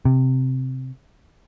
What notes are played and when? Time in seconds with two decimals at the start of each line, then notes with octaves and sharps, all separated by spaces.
0.05 C3